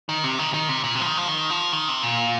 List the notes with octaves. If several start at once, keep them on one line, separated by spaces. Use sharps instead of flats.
D#3
C3
D#3
D#3
C3
A#2
C3
F3
D#3
F3
D#3
F3
D#3
C3
A#2